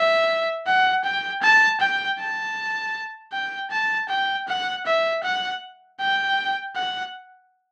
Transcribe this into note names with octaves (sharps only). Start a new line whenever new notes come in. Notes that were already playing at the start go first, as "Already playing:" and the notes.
Already playing: E5
F#5
G5
A5
G5
A5
G5
A5
G5
F#5
E5
F#5
G5
F#5